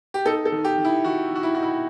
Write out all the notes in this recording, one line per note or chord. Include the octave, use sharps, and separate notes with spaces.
G4
D#4 A4
A4
D#3
G4
D#3
E4
D#3 F#4
D#3
F#4
E4
D#4 F#4
E4